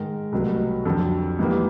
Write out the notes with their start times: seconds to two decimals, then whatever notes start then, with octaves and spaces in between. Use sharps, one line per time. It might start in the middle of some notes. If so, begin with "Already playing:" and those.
Already playing: G#2 D#3 G#3 A#4
0.32 C2 B2 F#3 A3
0.85 F2 D3 F#3 A4
1.39 G#2 E3 G3 A#3